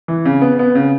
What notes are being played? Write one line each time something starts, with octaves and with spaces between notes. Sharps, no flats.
E3
C#3
B3
B3
C#3